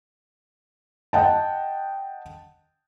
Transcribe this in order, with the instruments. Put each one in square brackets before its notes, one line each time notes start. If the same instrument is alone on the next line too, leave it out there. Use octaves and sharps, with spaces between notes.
[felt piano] D#5 F#5 G5 A5